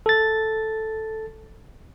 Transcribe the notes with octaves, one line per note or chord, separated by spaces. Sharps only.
A4 A6